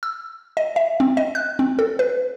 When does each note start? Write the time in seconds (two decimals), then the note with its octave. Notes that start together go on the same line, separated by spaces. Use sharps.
0.03 E6
0.57 D#5
0.76 E5
1.00 C4
1.17 D#5
1.35 F#6
1.59 C4
1.79 A4
1.99 B4